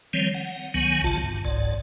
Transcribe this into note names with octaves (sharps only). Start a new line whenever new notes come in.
D#3 F3 G3 C4 C#5
F#5
C#2 D#3 F#3 B3 G#5
A1 C#3 F4 A5
G2
F#1 C2 G#2 D5